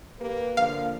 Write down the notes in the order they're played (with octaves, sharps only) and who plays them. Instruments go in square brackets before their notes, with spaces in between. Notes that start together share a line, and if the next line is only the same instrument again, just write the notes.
[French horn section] A#3 G4 B4
[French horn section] D3 F3 A#3 [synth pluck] F5